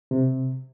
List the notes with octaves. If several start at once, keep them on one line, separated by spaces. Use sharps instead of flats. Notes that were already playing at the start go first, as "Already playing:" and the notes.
C3